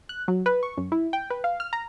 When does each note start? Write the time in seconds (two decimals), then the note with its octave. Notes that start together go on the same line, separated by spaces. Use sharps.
0.09 F#6
0.28 F#3
0.46 B4
0.63 C#6
0.77 F#2
0.92 E4
1.13 G5
1.30 B4
1.44 F5
1.60 F6
1.73 A#5